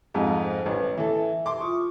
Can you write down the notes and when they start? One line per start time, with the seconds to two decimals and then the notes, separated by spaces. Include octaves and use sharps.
0.14 F2 G#2 F5 G#5
0.43 C5
0.66 A1 B4 C#5
0.98 E3 A4 E5
1.46 C6 D6
1.61 F4 C#6 D#6